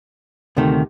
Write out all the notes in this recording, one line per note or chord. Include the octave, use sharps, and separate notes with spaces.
D2 C3 D#3 A3